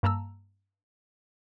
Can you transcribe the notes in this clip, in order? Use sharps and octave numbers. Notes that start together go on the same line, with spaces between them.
G2 A#3 A5 A#5 E6